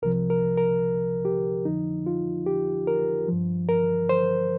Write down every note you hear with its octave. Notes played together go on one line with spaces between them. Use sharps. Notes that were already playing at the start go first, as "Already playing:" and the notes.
C2 C3 F3 A#4
A#4
A#4
G4
F2 D3 F3 D#4
F4
G4
A#4
G2 F3
A#4
C5